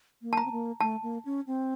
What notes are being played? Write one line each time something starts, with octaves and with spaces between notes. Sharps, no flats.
A#3
A5
A#5
C4
A#3
A3 A5
A#3
C#4
C4